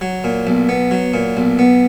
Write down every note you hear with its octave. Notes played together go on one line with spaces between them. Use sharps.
F#3
A#2
B1
B3
F#3
A#2
B1
B3